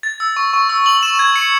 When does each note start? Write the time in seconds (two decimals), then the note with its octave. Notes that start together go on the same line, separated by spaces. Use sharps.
0.03 A6
0.20 E6
0.36 C#6
0.53 C#6
0.69 E6
0.86 F#7
1.03 E7
1.19 G#6
1.36 C#7